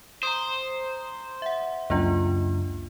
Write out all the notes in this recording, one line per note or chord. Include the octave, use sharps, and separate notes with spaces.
C5 A#5 D#6
E5 F#5
C#2 F#2 A#3 D4 F4